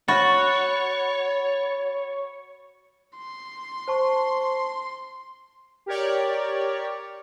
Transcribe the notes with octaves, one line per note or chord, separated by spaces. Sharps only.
F#4 C#5 B5 A6
C6
C5 A5 C#6
G4 A#4 C#5 D5